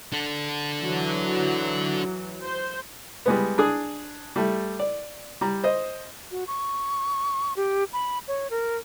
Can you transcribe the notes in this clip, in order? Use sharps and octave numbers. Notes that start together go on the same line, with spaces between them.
D4 A4
E3 F#3
C5
G3 G#3 B3
D4 G#4 D#6
G3 A3
D5
G3 A#5
C5 D#5
F#4
C#6
G4
B5
C#5
A#4